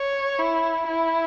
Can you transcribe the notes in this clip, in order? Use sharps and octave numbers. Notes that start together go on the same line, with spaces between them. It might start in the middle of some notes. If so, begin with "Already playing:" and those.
Already playing: C#5
E4
E4